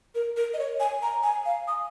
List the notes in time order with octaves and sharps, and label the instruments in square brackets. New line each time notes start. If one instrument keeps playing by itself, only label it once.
[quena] A#4
A#4
D#5
C#5
G#5
A#5
G#5
F5
D#6